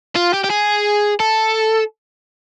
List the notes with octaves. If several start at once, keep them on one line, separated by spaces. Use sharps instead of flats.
F4
G4
G4
G#4
A4